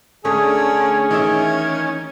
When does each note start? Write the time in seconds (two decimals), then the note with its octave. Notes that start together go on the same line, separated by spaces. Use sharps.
0.25 D2 D3 A3 C#4 G#4
1.11 D#3 E3 E5